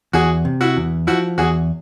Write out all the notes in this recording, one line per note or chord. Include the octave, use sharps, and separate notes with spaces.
E2 F#4 G#4
C3
E4 F#4
E2
F3 E4 F#4
E2 F#4 G#4